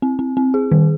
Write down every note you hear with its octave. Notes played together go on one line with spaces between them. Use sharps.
C4
C4
C4
G#4
D#3